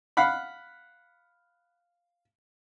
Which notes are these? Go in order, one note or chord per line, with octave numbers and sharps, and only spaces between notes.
F5 F#5 B5